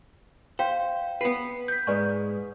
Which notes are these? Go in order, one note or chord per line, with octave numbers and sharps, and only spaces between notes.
C5 F5 G5
B3 B4 C7
G6 B6
G#2 G#3 B4 D5 C#6